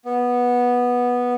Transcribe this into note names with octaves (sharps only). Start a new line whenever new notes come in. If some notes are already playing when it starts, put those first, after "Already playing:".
B3